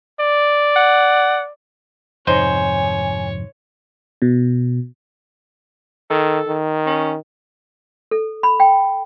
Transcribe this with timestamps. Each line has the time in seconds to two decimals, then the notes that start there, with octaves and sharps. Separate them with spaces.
0.20 D5
0.76 F#5
2.27 F2 G#2 C3 D#4 C5 C#5 G#5
4.22 B2
6.10 D#3 A4
6.48 D#3
6.86 C#4
8.11 A4
8.43 B5
8.60 G5